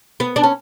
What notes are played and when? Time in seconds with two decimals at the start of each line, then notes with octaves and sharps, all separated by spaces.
0.20 B3
0.36 D4
0.44 C#4